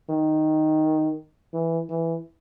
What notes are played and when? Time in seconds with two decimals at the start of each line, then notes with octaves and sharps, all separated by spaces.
0.10 D#3
1.53 E3
1.89 E3